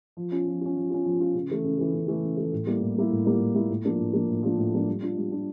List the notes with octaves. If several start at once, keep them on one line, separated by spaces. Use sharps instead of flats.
F3
C#4 F4
F3
C#4 F4
F3
C#4 F4
F3
C#4 F4
C#3
E3 A3
C#3
E3 A3
C#3
E3 A3
C#3
A3
E3
A2
G3 A#3 E4
A2
G3 A#3 E4
A2
G3 A#3 E4
A2
G3 A#3 E4
A2
F3 A#3 D4
A2
F3 A#3 D4
A2
F3 A#3 D4
A2
F3 A#3 D4
G3
D4 F4
G3
D4 F4